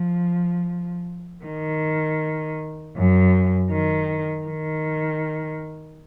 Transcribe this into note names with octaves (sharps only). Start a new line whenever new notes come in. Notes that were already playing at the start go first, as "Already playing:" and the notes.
Already playing: F3
D#3
F#2
D#3
D#3